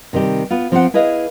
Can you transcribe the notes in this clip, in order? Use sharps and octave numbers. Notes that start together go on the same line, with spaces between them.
C3 D#3 G3 G4
B3 F4
F3 C4 F4 C5 C#5 F#5
E4 G#4 B4 D#5 F5